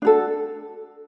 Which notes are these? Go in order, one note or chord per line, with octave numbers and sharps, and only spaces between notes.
D4 F#4 A4